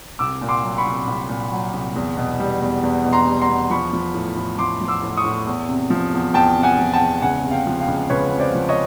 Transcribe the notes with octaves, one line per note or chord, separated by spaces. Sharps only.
C2 D6 E6
A#2
C6 D6
F#3
B5 C#6
C2
C2
A#2
F#3
C2
E2
B2
G3
E2
E2
B2
A#5 C6
G3
A#5 C6
E2
F3 B5 C#6
F3
A2
A2
F3 C6 D6
F3
D6 E6
A2
C#6 D#6
A2
E2
C3
F3
E2
E2 G5 A5
C3
F#5 G#5
F3
G5 A5
E2
C#2 F#5 G#5
C3
F5 G5
F3
F5 G5
C#2
C#2 B4 C#5
C3
C5 D5
F3
C#5 D#5